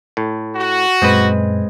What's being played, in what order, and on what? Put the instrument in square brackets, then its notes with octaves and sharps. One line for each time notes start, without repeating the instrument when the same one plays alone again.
[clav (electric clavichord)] A2
[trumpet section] F#4
[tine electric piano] F#2 A#2 [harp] G#3 [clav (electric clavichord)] C4 B4